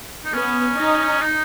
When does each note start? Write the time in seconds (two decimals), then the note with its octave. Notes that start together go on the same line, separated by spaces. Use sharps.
0.24 D#4
0.33 B3 C#4
0.78 D#4
1.21 D#4